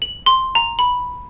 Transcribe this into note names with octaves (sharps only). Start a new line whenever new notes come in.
F#7
C6
A#5
B5